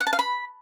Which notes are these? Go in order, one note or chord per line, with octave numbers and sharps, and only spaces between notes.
F#5
A5
F5
B5